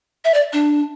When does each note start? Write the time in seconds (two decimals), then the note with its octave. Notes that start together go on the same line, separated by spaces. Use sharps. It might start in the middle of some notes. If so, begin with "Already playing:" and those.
0.25 E5
0.34 D5
0.53 D4